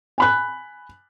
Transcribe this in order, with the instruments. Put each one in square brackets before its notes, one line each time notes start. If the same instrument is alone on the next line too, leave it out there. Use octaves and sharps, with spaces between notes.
[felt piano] G#5 B5 F#6